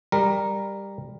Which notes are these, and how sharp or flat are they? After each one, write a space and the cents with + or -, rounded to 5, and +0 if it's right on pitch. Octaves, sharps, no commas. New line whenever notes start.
G3 +15 A#4 +0